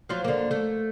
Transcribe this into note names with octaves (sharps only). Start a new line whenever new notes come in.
F3 F#3 F4
D3 A#3
A3